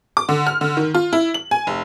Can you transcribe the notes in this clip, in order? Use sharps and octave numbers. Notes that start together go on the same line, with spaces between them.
D6
D3
F6
D3
D#3
F4
E4
F#7
G#5
F1